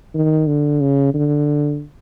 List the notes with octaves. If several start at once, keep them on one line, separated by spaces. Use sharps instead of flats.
D#3
D3
C#3
D3